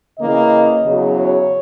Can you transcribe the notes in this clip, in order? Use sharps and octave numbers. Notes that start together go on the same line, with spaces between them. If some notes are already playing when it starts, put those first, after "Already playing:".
C#3 E3 A#3 D#5
E2 C#3 F#3
C#5